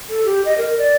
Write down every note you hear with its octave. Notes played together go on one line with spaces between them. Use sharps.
A4
G4
D#5
A#4
D5